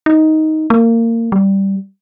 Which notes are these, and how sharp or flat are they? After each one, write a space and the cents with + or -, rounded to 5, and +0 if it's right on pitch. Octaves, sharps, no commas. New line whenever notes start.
D#4 +10
A#3 -25
G3 -5